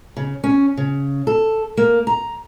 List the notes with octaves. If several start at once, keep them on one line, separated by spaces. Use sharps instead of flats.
C#3
C#4
C#3
A4
A#3
A#5